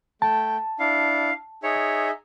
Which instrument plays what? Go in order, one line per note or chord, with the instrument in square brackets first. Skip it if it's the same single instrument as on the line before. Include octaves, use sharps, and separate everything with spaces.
[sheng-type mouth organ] A3 G5 [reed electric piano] A5
[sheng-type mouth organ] D4 E4 [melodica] F5
[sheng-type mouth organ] D#4 G#4 E5 [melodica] C#5